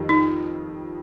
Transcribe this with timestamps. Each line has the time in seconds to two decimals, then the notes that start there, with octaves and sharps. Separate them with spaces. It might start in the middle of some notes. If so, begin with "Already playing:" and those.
Already playing: F2 D#3 G3
0.09 D#4